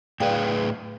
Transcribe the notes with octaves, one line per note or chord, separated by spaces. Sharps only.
A2 G#4 B4 D5 F5 G5